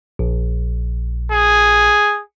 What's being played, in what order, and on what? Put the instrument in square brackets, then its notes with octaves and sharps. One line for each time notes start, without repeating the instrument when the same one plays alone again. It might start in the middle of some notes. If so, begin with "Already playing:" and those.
[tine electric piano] A#1
[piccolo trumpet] G#4